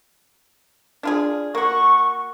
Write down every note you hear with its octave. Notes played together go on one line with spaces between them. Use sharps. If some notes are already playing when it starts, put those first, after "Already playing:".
D4 F4 G#4
A#3 F#4 C#6